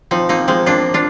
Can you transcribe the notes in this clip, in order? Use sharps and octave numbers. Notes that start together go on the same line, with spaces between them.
F3 C4 D#4
A#3 C4 D#4
F3 G#3 C4
A#3 D4 F4
D4 F4